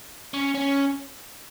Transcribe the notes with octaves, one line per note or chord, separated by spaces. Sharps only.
C#4
C#4